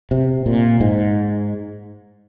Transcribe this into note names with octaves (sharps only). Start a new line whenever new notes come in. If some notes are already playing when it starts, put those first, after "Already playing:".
C3
A#2
G#2